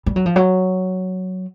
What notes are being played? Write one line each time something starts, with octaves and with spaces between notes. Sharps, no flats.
G3
F#3
F3
F#3